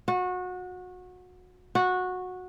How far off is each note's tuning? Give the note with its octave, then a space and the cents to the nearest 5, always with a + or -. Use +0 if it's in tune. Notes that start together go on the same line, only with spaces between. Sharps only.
F#4 -25
F#4 -15